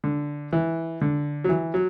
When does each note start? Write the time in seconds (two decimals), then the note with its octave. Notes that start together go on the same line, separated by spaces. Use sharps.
0.04 D3
0.53 E3
1.01 D3
1.44 F#3
1.49 E3
1.74 F#3